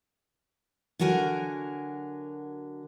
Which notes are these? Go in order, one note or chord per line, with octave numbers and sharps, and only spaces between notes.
D3 F#3 F#4 A#4 G#5